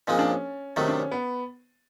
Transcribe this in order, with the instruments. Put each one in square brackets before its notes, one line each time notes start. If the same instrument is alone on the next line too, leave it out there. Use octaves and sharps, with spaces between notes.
[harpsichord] A#2 F3 G#3 C4 [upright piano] D#4
[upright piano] D4
C#4
[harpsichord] C3 D#3 F#3 A3 [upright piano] D#4
[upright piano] D4
C#4
B3